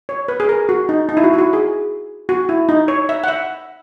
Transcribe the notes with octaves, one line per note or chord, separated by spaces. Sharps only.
C#5
B4
G#4
A#4
F#4
D#4
D#4
E4
F#4
E4
F#4
G#4
F#4
E4
D#4
C#5
E5
F#5
E5